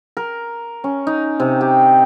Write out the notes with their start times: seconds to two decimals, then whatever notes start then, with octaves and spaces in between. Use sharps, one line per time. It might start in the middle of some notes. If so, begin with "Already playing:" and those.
0.17 A#4
0.84 C#4
1.07 D#4
1.40 C3
1.61 G4